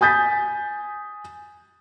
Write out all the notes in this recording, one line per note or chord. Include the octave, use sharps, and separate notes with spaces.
G#5 D#6 G6 A6 B6